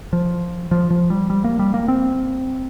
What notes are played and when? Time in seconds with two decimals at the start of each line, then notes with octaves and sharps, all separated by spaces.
0.13 F3
0.71 F3
0.91 F3
1.10 G3
1.30 G3
1.44 A#3
1.59 G3
1.74 A#3
1.88 C4